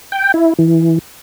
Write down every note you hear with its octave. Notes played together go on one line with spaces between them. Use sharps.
G5
E4
E3